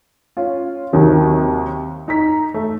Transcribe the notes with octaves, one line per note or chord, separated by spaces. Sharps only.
C#4 F4
D#2 C3 D#3 F#3
D#4 A#5 B6
A3